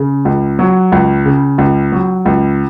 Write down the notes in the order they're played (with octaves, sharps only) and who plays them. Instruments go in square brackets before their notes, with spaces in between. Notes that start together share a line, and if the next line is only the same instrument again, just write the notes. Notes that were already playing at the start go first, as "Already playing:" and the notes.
Already playing: [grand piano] C#3
C#2
F#3
C#2
C#3
C#2
F#3
C#2